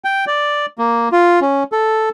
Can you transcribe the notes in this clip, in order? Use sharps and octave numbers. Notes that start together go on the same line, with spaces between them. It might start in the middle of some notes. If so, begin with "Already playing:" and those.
G5
D5
A#3
F4
C#4
A4